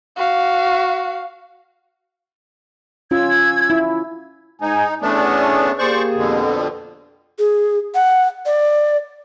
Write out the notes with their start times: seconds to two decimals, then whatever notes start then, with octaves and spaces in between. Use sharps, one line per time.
0.16 F#4 F5
3.11 C#4 F4 E6 G#6
3.70 E4
4.61 G#2 D#4 G#5
5.02 E2 A3 B3 C#4 D4
5.79 A#3 G4 G#4 C5 D5 C#6
6.15 F2 B2 D3
7.39 G#4
7.95 F#5
8.46 D5